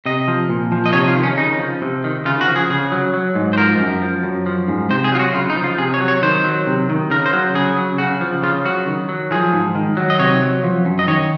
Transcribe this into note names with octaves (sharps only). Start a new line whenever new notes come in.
C3 D#5
F3
A#2
F3
D#5
C3 C#5
F4
D#3
C#4
C#3 D#4
F3
C3
D#3
C#3 F4
F#4
F3
G#4
C#3 G#4
F#3
F#3
G#2
C5
F3 A#4
F#2
F3
F#2
F3
G#2
C3 C5
G#4
F#3 F4
F#4
C#3 F4
D#4
F3
F4
C3 G#4
C#5
F#3
C#5
D#3 C5
F#3
C3
D#3
C#3 A#4
C5
F#3
C#3 G#4
F#3
C#3 F#4
F3
C#3 F4
F#3 F#4
D#3
F#3
F3 G#4
G#2
D#3
F#3
D#5
C3 C#5
F#3
F3
F#2
D#5
D#3 C#5